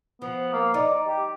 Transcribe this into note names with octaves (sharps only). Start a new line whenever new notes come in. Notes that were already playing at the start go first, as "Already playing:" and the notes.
F3 B3
A#3
D#4 D5
G4